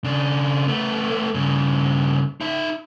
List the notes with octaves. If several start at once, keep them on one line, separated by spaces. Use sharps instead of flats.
C#3 D4
A3 B3
G2 C#3
D#4 E5